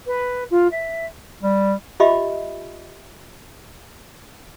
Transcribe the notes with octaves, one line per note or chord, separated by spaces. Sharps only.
B4
F4
E5
G3
F4 G4 D#5 E5 B5 D6